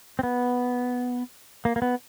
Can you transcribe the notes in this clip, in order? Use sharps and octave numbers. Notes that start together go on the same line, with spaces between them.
C4
B3
A#3
A#3
B3